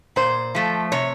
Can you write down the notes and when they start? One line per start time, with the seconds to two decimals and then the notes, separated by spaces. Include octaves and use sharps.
0.16 A#2 C5
0.55 F3 A3
0.92 C3 C#5